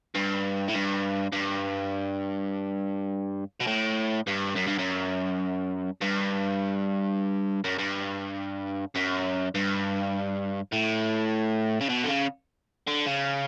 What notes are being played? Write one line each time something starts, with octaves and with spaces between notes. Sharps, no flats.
G2
A2
G2
G2
B2
A2
G2
F#2
G2
F#2
G2
F#2
G2
F#2
G2
A2
C#3
B2
D3
C#3
D3
C#3